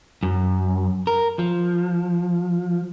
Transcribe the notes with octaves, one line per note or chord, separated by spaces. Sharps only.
F#2
A#4
F3